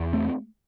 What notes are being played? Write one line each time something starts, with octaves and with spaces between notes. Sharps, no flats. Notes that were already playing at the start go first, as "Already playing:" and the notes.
Already playing: E2
A3 C4